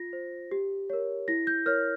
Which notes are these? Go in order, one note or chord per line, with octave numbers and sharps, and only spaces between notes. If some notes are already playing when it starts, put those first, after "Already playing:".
Already playing: F4 A#6
C5
G4
A#4 C#5
E4 A#6
G6
A#4 C#5 F6